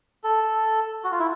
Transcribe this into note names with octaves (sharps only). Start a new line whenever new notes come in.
A4
F#4
F4
E4